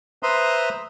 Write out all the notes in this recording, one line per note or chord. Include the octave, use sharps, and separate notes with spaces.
B4 C5 E5 A#5 C6 D#6